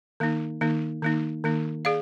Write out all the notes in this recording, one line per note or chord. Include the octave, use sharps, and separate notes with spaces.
D#3 A#3 D#4
D#3 A#3 D#4
D#3 A#3 D#4
D#3 A#3 D#4
G#4 D5 F5